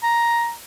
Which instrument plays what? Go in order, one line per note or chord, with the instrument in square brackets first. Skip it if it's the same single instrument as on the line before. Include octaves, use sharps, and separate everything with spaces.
[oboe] A#5